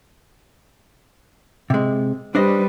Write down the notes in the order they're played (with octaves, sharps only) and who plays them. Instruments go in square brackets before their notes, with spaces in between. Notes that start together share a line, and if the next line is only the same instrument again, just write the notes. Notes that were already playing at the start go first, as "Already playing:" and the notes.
[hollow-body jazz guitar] C3 G#3
[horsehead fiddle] G3 B4 [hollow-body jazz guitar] D4 C5 D#5